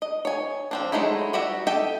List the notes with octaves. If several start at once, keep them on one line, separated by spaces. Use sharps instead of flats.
D#5
C#5 G#5
F3 C4 D4
F#3 G#3 A3 D#4 E4
G3 F#4 G4 E5
G4 A4 D#5 E5 G5